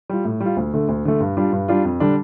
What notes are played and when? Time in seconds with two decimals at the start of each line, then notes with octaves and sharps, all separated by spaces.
0.09 G3 F4
0.25 A2
0.41 G3 F4
0.57 D2
0.74 D3 A3
0.89 D2
1.05 D3 A3
1.20 G2
1.37 G3 D4 F4
1.52 G2
1.68 G3 D4 F4
1.85 F2
2.00 D3 G3 D4